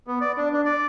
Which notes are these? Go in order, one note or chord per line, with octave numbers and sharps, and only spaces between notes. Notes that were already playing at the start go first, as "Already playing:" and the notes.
B3
D5
D4
D4
D5